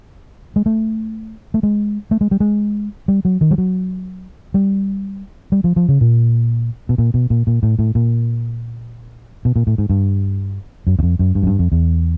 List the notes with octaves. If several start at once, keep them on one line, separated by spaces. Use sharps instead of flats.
G#3
A3
A3
G#3
A3
G#3
G3
G#3
G3
F#3
D#3
G3
F#3
G3
G3
F3
F3
C#3
A#2
B2
A#2
B2
A#2
A#2
A2
A2
A#2
B2
A#2
A2
G#2
G2
F#2
E2
F2
F#2
G2
F#2
G2
F2
E2